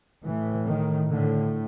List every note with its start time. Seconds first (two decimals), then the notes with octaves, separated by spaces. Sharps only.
0.22 A2 E3
0.65 D#3
1.08 A2 D3